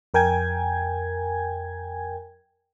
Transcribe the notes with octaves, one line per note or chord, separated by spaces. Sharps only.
F2 A#4 G5 G#5 G#6